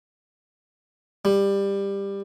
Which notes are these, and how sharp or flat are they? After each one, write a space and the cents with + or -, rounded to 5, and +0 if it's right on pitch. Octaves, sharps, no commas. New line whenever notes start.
G3 +15